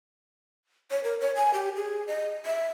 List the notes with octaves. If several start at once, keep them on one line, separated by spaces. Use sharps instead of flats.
C#5
A#4
C#5
G#5
G4
G#4
D#5
E5